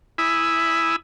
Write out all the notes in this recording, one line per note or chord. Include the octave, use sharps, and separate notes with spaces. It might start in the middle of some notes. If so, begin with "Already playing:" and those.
E4 G#5 B5 D#6 E6